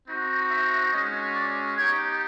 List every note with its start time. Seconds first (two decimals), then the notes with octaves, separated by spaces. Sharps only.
0.08 C4 D#4 F#4
0.50 E5
0.92 G#3 C#4 F#4 D#5
1.35 D5
1.78 B3 D#4 G4 C#5